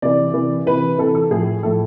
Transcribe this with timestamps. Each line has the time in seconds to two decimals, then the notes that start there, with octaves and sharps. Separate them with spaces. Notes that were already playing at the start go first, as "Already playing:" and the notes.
0.02 C3 E3 D5
0.34 C3 E3
0.66 C3 E3 B4
0.98 C3 E3 A4
1.15 A4
1.31 A2 F3 G#4
1.63 A2 F3 A4